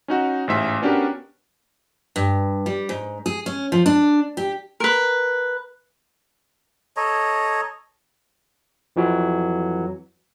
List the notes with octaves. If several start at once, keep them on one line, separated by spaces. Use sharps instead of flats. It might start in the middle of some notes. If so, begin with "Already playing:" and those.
C#4 D#4 F#4
A1 G#2 E5
B3 C#4 D4 F#4 G4 A#4
G2
G3
G#2
G#4
C#4
F3
D4
G4
A#4 B4
A4 C#5 D#5 A#5
F2 E3 F#3